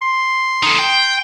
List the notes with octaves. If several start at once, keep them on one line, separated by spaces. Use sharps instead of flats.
C6
D#4 A4
G5